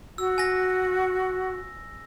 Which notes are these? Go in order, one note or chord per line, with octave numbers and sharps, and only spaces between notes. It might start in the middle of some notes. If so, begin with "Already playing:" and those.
F#4 E6
G#5 A#6